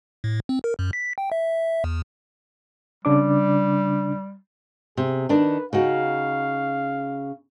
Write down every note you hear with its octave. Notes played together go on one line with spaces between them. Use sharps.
A2
C4
A#4
F#2
B6
G5
E5
E2
C#3 G3 D4 D6
C3 G#4
D#3 D4 B4
C#3 D#4 F#4 F5